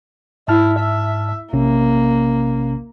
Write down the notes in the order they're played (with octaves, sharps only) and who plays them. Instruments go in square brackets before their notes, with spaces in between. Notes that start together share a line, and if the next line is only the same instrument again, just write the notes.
[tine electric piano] G#2 A5 F6 [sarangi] E4
[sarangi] E5
[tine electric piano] A#1 C3 C#4 [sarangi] A#3